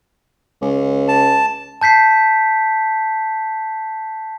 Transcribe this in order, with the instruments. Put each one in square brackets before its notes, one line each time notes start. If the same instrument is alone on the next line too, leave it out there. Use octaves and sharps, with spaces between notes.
[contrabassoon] C#2
[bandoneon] A5
[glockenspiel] A5 G6 B6 C7